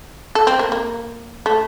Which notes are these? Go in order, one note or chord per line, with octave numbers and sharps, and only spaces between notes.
A4
C4
A#3
A#3
A3